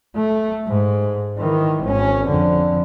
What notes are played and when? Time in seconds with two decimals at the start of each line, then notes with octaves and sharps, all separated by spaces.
0.16 A3
0.68 G#2
1.38 D#3 E3
1.84 G#1 C#4
2.27 F2 D3